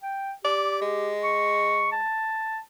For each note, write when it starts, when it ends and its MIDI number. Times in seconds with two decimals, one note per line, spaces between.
0.03 0.32 79
0.45 1.13 67
0.45 0.79 74
0.81 2.04 56
1.24 1.92 85
1.92 2.60 81